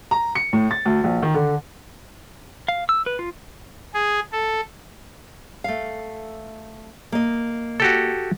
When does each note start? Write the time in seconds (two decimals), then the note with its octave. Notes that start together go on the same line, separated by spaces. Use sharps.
0.11 A#5
0.35 C#7
0.53 A2
0.71 A6
0.85 D2
1.04 A#1
1.23 D#3
1.34 D3
2.68 F5
2.89 E6
3.06 B4
3.19 F4
3.94 G#4
4.32 A4
5.64 A3 F5
7.12 A#3 D#5
7.80 F#4 G4 A4